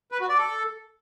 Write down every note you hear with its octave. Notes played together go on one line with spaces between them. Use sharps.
B4
F#4
D5
A4